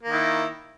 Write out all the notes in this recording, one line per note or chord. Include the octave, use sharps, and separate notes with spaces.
D#3 A#3 E4